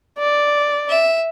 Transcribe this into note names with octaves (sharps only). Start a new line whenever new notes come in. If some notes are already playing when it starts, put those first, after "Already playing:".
D5
E5